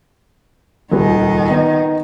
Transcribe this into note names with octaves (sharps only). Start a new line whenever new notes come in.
D#1 C#2 D#3 D#5
B3 D#4